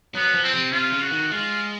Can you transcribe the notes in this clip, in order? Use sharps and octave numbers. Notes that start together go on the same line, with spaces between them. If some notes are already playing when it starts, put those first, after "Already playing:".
F#3 B3
F3
C4
C3
C3 F4
C#3
F#4
D#3
G#3 F4